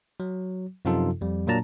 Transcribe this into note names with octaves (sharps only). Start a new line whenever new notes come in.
F#3
F#2 C3 F3 D#4 F4 A4
F2 G3
A#2 F#3 A#3 D4 A5 A#5